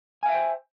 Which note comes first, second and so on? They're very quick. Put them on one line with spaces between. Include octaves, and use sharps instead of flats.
G#5 F5 E5 G5 C5